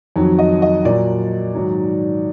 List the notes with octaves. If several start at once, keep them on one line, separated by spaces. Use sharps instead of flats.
F2 D#3 F#3
D#5
D#5
A#2 F#3 D5
G#2 D#3 F#3